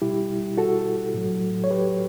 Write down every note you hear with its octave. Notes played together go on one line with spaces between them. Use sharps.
B2 G3 E4 G4
F#4 A4
A2 F#3
C#5
G4 B4